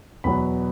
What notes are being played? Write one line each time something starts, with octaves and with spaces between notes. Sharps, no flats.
E2 B2 F#3 B5